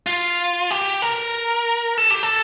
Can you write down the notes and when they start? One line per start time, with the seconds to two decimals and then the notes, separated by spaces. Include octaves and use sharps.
0.06 F4
0.71 G4
1.02 A#4
1.98 A4
2.10 G4
2.23 A4